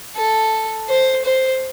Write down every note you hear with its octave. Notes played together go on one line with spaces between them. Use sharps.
A4
C5
C5